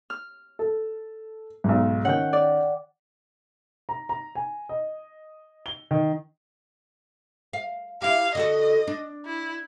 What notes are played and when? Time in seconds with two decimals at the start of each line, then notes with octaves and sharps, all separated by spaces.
0.10 F6
0.59 A4
1.64 B1 G#2
2.05 D#3 C#4 F#5 G5
2.33 D5
3.89 A#5
4.09 A#5
4.35 G#5
4.69 D#5
5.66 G7
5.91 D#3
7.53 F5
8.02 E4 G4 F5
8.35 D3 F#4 A4 D#5
8.87 D4
9.25 E4